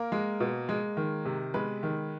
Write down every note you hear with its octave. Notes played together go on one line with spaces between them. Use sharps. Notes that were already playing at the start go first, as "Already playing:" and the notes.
Already playing: A#3 A#4
G#3
B2
G#3
D#3
C3
G#3 B3 B4
D#3